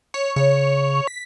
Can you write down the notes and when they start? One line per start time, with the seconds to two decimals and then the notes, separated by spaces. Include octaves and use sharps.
0.14 C#5
0.36 C#3 C#5
1.07 B6